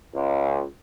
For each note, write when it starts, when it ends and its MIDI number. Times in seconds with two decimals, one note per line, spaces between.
0.15 0.63 37